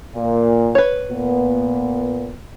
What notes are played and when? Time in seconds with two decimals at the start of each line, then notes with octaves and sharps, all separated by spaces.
0.14 A#2
0.75 B4 C#5
1.09 A#2 B3